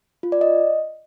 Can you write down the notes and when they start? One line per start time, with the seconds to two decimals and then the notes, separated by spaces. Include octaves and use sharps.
0.23 F4
0.32 D5
0.41 D#5